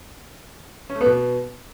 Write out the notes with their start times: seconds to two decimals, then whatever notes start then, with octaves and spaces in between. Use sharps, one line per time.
0.90 C#4
0.95 A3
1.01 B3
1.06 B2